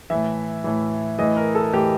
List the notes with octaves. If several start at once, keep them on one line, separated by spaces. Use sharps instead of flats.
A2 E3 E5
A2 E3
A2 E3 D#5
A#4
A4
A2 E3 G4